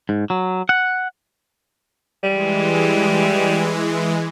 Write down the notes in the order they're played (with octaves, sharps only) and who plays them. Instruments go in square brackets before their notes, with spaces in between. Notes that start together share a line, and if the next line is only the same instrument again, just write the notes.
[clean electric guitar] G#2
F#3
F#5
[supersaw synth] E3 G#3 [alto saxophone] G3